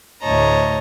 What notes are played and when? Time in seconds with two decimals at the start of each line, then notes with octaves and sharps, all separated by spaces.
0.22 D2 A2 C#5 D#5 A5 A#5